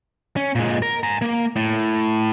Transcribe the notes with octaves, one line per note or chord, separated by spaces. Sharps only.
C#4
A#2 G#3
A#4
G#5 A#5
A#3
A2